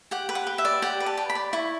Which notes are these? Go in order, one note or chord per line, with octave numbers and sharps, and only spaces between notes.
G4 F#5
B4
F#5
G4
E5
D5
G4 F#5
B4
A5
G4
B5
D5
E4 C#6